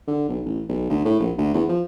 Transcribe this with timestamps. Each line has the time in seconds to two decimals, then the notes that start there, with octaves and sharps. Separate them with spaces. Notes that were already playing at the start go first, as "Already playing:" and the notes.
0.08 D3
0.28 B1
0.46 A1
0.69 B1
0.90 D2
1.05 A2
1.20 A#1
1.38 D2
1.54 E2
1.69 F3